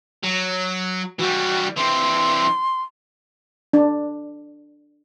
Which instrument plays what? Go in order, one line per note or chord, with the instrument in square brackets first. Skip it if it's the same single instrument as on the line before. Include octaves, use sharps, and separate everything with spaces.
[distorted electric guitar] F#3
[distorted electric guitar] E3 G3 [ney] F#4
[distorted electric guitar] E3 C4 [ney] C6
[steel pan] D4